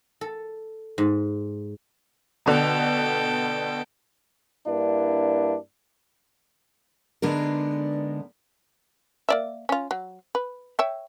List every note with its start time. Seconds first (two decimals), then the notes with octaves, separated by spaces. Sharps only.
0.21 A4
0.98 G#2
2.46 B2 D3 A4 G5
4.67 G2 A#3 D4 E4
7.22 D3 G#3 B3 D4 D#4 A#4
9.29 A#3 D5 E5
9.69 C#4 F4
9.91 F#3
10.35 B4
10.79 C#5 E5 G5